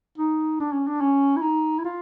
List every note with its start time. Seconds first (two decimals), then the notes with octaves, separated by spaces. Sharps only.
0.18 D#4
0.60 D4
0.72 C#4
0.87 D4
1.00 C#4
1.36 E4
1.42 D#4
1.78 E4
1.84 F4